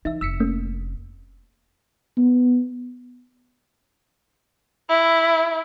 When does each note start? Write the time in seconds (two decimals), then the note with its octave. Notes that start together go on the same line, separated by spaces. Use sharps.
0.05 E3 D#4 E5
0.21 F1 E6 B6 C#7
0.40 A3 A#3 C#4
2.17 B3
4.90 E4